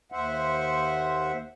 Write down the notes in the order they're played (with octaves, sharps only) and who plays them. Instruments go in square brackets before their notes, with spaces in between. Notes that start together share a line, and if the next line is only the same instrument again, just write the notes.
[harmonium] D#2 C5 E5 F#5